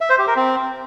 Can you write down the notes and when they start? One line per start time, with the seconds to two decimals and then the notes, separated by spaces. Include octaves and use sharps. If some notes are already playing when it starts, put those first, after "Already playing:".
0.01 E5
0.10 C5
0.18 G4
0.27 A#4
0.36 C4